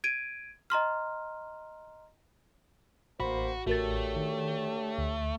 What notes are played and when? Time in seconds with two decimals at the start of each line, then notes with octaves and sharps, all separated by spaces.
0.04 G#6 D7 D#7
0.70 D#5 A#5 C6 F6
3.20 A1 D2 A#3 F#4 C5 B5
3.67 A1 D3 A3 F#4 G4 A#4 C#5 A6
4.16 D#3
4.98 D2